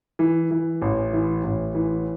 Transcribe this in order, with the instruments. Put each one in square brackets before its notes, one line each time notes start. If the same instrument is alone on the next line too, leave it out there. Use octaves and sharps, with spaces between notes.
[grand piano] E3
E3
A1
E3
A1
E3